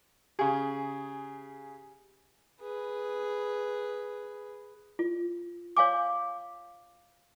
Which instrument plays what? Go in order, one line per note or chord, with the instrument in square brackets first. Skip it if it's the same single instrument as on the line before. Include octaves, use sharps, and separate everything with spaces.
[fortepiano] C#3 G#4 [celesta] G4 G#5
[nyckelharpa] G#4 B4
[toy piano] F4
C#5 F5 G#5 D6